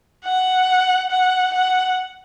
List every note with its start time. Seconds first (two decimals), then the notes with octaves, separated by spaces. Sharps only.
0.25 F#5
1.11 F#5
1.53 F#5